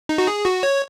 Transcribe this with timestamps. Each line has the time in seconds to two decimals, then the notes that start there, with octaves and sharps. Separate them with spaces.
0.09 D#4
0.18 F#4
0.27 G#4
0.45 F#4
0.63 C#5